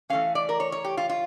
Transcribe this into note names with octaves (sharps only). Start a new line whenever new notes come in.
E3 A3 C#4 F5
D5
A#4
C#5
C#5
G4
F4
F4